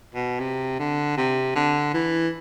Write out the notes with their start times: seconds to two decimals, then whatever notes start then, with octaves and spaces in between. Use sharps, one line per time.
0.15 B2
0.40 C3
0.79 D3
1.17 C3
1.55 D3
1.94 E3